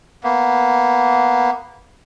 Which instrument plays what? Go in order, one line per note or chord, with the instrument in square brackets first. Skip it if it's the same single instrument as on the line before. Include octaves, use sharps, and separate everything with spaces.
[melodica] A#3 B3